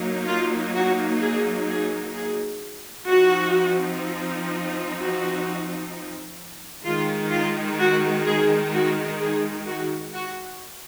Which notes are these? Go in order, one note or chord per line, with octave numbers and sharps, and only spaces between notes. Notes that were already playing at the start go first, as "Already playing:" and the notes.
Already playing: F#3 A#3 D#4
F4
F#4
G#4
G#4
G#4
F3 C4 D#4 F#4
F#4
D#3 G#3 D#4 F4
F4
F#4
G#4
F#4
G#4
F#4
F#4